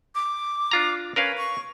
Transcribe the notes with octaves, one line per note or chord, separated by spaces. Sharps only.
D6
D4 F4 A#5
C#4 A#4 B4 F5
C#6